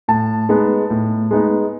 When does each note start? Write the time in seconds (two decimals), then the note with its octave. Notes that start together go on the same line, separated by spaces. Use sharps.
0.08 A2 A5
0.49 G#3 B3 D#4
0.90 A2
1.31 G#3 B3 D#4